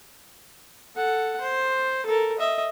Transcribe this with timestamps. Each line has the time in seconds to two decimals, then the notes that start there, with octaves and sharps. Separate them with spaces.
0.95 A4 F#5
1.41 C5
2.06 A4 A#4
2.38 D#5 E5